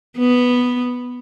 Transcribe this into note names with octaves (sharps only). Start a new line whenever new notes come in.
B3